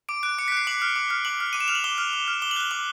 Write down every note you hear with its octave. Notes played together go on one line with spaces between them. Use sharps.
D6 D7
F#6 D7
D6 C#7
B6
F#6 C7
D6 F#7
F6
D6
F6
D6 F#7
F6
D6 D#7
E7
F6 F7
F#7
D6 G7
F6
D6
F6
D6 G7
F#7
F#6 G7
D6 F#7